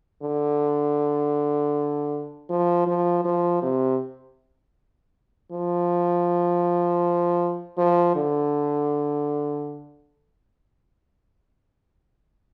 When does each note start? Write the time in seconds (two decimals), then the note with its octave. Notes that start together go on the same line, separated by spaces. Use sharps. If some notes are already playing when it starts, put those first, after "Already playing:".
0.22 D3
2.49 F3
2.87 F3
3.24 F3
3.62 C3
5.52 F3
7.78 F3
8.15 D3